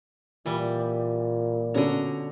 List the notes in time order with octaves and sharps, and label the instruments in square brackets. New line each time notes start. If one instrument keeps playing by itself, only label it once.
[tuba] A#2 [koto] E3 G3
[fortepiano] B2 C#4 D4 [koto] D3 A#5